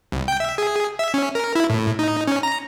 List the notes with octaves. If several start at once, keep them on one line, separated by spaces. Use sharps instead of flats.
C2
G5
E5
G#4
E5
C#4
A#4
E4
A2
D#4
C#4
A#5